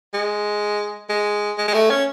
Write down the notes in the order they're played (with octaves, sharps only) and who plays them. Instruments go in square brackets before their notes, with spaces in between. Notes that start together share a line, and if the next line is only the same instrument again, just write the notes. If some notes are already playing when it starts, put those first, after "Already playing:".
[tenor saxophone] G#3
G#3
G#3
G#3
A3
C#4